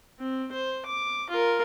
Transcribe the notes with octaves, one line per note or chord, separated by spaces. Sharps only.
C4
C5
D6
F4 A#4